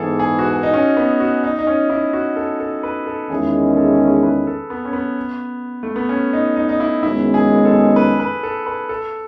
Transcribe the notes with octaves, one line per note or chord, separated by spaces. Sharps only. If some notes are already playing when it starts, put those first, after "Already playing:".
Already playing: G#2 E3 B3 G#4 A4
G#4
F#4
G#4
D#4
C#4
B3
F#4
D#4
D#4
C#4
E4
F#4
A4
A4
B4
A4
E2 D#3 G#3 C#4 E4 G#4
G#4
A4
B4
A4
B3
C#4
B3
A3
B3
C#4
D#4
D#4
D#4
E4
F#2 D#3 G#3 B3 E4
G#4
A4
B4
B4
A4
B4
A4